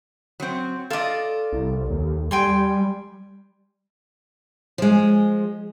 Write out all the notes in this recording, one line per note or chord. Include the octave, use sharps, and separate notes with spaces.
F#3 C4
F4 A4 D5 D#5
C2
D#2
G3 G5 G#5 C6
F3 G#3